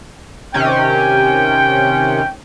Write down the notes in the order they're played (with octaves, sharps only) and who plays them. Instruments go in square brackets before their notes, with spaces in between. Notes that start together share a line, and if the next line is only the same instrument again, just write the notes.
[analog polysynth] C3 D#3 C#4 [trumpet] G5